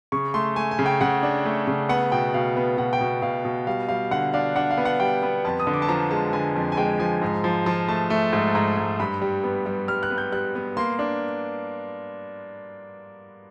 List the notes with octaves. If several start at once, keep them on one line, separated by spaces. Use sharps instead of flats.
C#3 C#6
A3 C6
A3 G#5
G#5
C#3
G5
C#3 F#5
D4
A3
C#3
B3 F#5
B2 G5
B2 F5
B3
B2 F#5
G5
B2
B2 F5
B2
G3 F5
G3 F5
D3 F#5
D4 F5
D4 F#5
F5
B3
F#5
G3 G5
B3
F2 A5
D#6
D3
D6
A5
F3 A#5
G#3 A5
D3 G#5
F2
G#5
G#3 G5
F3 G#5
G#2
F3
F3 A5
A3 A5
A3
G#2
G#2 A#5
G#2
G2 B5
G3
B3
G3
G3 F6
F#6
B3
G6
G3 F#6
B3
A#3 C6
D4